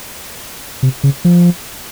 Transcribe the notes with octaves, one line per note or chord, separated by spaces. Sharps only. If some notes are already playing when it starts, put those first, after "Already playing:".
C3
C#3
F3